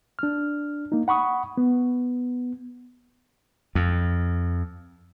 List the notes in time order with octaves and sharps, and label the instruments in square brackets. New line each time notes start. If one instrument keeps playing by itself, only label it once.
[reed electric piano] D4 F6
A#3 D#4
F#5 B5 C#6 D#6
B3
[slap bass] F2